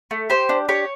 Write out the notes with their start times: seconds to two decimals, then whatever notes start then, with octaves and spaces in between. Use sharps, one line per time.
0.11 A3
0.30 G4 C5
0.49 D4
0.69 G4 C#5